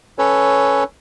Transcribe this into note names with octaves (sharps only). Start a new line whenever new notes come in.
C#4 A4 B4 C#5